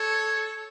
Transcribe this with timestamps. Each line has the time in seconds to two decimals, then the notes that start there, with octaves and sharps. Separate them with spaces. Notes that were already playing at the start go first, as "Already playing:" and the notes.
Already playing: A4 C#5